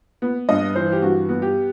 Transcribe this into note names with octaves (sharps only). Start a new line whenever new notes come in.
B3
G2 D#5
E3 C5
G4
G2 F#4
B3
G4